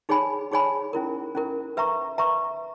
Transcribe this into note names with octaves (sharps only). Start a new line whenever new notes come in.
D#4 G#4 C#5 G#5 B5
D#4 G#4 C#5 G#5 B5
C#4 E4 A#4
C#4 E4 A#4
B4 E5 A#5 C#6
B4 E5 A#5 C#6